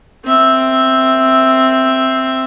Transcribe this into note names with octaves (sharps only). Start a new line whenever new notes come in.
C4 E5